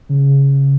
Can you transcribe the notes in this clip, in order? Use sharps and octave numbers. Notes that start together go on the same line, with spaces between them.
C#3